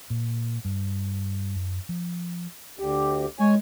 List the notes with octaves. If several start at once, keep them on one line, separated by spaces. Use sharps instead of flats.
A#2
G2
F#2
F3
D2 G4
G#3 C#5 G#5